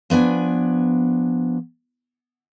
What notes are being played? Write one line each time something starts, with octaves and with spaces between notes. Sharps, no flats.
F3 B3 D4 G#5